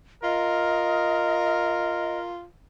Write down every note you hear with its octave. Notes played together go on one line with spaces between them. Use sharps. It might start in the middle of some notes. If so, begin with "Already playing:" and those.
F4 A#4 D#5